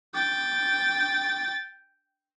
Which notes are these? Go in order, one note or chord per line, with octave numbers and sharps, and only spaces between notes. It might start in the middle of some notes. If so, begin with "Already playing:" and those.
G5 A6